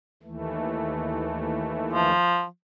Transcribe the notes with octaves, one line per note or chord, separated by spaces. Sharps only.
D#2 E3 A3
F3